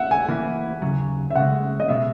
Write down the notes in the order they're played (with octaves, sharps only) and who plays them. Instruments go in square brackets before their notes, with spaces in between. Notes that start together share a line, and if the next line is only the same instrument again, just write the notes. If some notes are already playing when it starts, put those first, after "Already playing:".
Already playing: [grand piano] E5 F#5
G#5
[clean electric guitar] E3 A#3 E4
D#2 C#3 F#3
[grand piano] E5
[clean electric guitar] C#2 C#3 G#3 [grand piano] F#5
[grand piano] D#5
[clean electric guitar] B2 G#3 [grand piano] E5